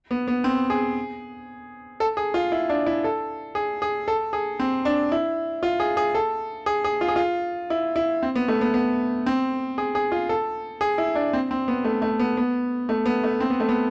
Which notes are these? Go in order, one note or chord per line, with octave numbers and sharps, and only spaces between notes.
B3
B3
C4
G#4
A4
G#4
F4
E4
D4
E4
A4
G#4
G#4
A4
G#4
C4
D4
E4
F4
G#4
G#4
A4
G#4
G#4
F4
G#4
F4
E4
E4
C4
B3
A3
B3
B3
C4
G#4
G#4
F4
A4
G#4
E4
D4
C4
C4
B3
A3
A3
B3
B3
A3
B3
A3
C4
B3
A3
B3